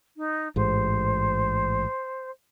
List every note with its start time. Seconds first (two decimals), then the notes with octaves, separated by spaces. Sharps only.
0.17 D#4
0.56 A1 G#2 C5